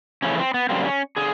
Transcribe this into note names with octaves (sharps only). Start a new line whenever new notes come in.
F2 C#3 E3 A3 C#4
C4
B3
F#2 D3 G3 A#3 C4
C#4
D3 G#4